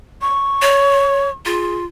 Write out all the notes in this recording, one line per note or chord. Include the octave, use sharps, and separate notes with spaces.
C#6
C#5
F4 G#4